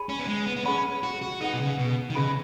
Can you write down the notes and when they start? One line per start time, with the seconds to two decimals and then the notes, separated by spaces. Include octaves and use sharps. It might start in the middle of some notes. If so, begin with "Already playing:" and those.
Already playing: G#4 C#5 G#5 B5
0.09 C#4
0.19 B3
0.27 G#3
0.46 B3
0.56 B3
0.65 C#4 G#4 D#5 F#5 B5
1.03 F#4
1.22 F#4
1.40 D#4 G#4 B4 D#5 F#5
1.53 B2
1.60 C#3
1.78 B2
2.10 D#3
2.15 C#3 G#4 B4 D#5 B5